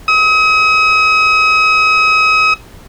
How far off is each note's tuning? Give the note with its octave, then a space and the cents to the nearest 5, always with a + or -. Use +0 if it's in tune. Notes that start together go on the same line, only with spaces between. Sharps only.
D#6 +40